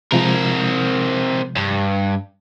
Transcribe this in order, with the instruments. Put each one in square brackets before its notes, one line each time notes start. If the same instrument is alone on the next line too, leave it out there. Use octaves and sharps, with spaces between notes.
[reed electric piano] C3 F3 G#3 [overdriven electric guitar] C4 A#4
[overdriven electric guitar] G2